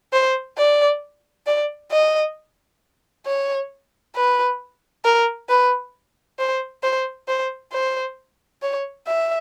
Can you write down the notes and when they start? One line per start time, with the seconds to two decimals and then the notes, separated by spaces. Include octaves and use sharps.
0.13 C5
0.58 D5
1.46 D5
1.92 D#5
3.26 C#5
4.16 B4
5.05 A#4
5.49 B4
6.39 C5
6.83 C5
7.28 C5
7.72 C5
8.62 C#5
9.07 E5